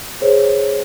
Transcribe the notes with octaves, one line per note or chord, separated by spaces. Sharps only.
G#4 C5 C#5